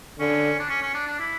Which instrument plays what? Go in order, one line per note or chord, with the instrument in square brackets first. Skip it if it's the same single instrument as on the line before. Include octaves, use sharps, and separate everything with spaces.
[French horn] D3 [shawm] C#4
[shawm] D4
C#4
C#4
D4
D4
E4